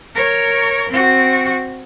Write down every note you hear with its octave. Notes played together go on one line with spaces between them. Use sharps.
A#4 C#5
C4 F#4